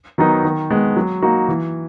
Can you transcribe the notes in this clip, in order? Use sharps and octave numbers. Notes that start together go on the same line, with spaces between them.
D#3 F#3 B3 D#4
D#3
G#3 B3
F#3
A#3 D#4 F#4
E3